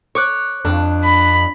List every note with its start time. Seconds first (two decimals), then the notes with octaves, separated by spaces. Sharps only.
0.15 C#5 C#6 D6 F#6
0.65 F2 D4
1.04 B5